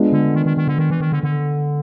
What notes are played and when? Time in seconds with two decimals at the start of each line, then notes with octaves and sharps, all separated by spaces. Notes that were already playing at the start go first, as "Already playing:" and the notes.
Already playing: G#3 B3 D4 F4 G#4
0.12 D3
0.35 D#3
0.46 D#3
0.57 D#3
0.68 D3
0.78 D#3
0.90 E3
1.01 D#3
1.12 D3
1.23 D3